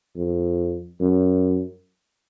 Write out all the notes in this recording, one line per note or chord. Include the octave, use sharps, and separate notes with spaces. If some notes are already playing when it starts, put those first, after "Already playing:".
F2
F#2